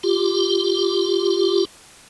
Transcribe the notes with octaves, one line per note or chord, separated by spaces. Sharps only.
F4 G4